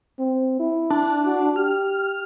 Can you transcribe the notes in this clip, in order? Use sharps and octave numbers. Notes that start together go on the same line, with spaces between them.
C4
E4
D4
F#4
G4 F6